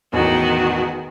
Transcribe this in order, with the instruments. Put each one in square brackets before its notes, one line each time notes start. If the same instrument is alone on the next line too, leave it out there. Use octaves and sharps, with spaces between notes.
[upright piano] E1 A1 E2 [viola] D#3 F#4